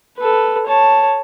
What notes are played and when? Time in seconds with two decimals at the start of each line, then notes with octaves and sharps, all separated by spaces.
0.18 A4 B4
0.66 C#5 A5